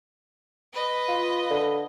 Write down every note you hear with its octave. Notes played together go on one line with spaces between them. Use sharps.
B4 D#5
F4
D3